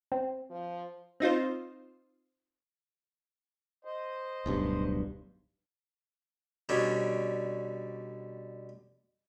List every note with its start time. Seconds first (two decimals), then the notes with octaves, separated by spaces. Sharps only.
0.12 C4
0.50 F3
1.20 C4 D#4 F4 C5
3.85 C5 D#5
4.46 D1 B1 G2
6.69 B2 D3 G3 C#4